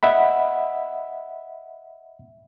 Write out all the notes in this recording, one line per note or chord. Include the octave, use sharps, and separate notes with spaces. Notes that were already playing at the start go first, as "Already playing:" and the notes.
D#5 E5 F#5 B5